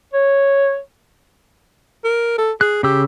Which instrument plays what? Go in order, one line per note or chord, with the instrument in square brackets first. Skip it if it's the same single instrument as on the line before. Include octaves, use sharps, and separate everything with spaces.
[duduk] C#5
[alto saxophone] A#4
A4
[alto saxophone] G#4 [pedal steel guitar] F#6
[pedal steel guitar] C#3 E6 [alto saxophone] G4